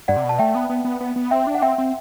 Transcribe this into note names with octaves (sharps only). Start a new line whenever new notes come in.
G2 D5 F#5
C3
B2
A5
A3 E5 G5
B3
B3
B3
B3
B3
C4 E5 G5
D4
F#5
C4 E5 G5
C4